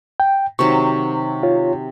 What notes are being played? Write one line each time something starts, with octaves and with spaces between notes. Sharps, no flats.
G5
C3 D#3 F#3 C#6
F4 C#5